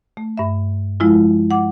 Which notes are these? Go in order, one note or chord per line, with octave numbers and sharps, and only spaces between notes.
A3
G2 E5
F3 G#3 E4 F4
F#5 D6